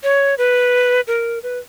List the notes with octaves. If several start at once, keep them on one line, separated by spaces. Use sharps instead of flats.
C#5
B4
A#4
B4